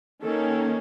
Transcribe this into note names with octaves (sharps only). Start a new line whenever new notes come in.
D#3 A#3 C#4 A4